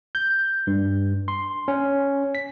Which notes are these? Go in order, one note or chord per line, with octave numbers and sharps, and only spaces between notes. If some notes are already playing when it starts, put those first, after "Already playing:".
G6
G2
C6
C#4
B6